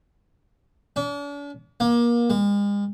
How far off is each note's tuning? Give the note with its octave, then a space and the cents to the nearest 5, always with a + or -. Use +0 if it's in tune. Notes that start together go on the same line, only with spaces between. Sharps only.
D4 -45
A#3 +30
G#3 -40